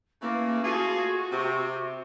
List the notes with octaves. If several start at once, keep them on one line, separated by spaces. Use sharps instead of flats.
C#3 E3 A3 A#3
A3 F4 F#4 G#4
C3